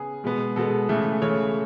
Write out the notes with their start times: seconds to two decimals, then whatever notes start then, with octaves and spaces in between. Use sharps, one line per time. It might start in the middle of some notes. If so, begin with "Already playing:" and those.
Already playing: C#3 B3 G#4
0.24 B2 G#3 B3
0.56 B2 G#3 B3 A4
0.89 C#3 E3 A3
1.21 C#3 E3 A3 C#5